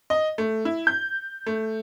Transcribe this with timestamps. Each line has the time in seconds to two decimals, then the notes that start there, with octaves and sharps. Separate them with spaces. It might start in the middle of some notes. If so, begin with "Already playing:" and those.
0.10 D#5
0.38 A3
0.65 E4
0.87 G6
1.46 A3